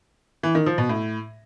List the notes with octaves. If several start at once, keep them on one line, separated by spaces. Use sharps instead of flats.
E3
D#3
F3
B2
A2